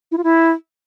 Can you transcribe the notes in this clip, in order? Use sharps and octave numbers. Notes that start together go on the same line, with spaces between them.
E4
F4
E4